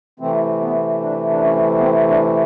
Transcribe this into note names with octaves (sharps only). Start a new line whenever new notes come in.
C3 E3 A3 C4
B3
D4
D4
C#4
B3
C4
D4